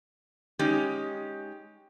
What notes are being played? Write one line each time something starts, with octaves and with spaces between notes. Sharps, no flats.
G#3 C#4 D#4 G4